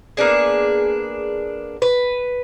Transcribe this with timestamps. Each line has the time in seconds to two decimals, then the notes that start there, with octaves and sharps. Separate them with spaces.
0.17 A#3 B3 D4 G#4
1.82 B4